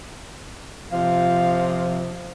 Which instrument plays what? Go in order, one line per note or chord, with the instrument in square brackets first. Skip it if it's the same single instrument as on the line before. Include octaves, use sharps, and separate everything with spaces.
[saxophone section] C3 F3 [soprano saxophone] F5